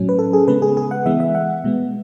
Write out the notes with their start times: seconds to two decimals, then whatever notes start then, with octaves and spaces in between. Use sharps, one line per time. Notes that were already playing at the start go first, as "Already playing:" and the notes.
Already playing: A2 F#3 C#4
0.09 B4
0.19 A4
0.33 G#4
0.48 C#3 G#3 B3 B4
0.62 G#4
0.77 G#4
0.91 F#5
1.06 E3 G#3 B3 E5
1.20 E5
1.35 F#5
1.64 B2 G#3 B3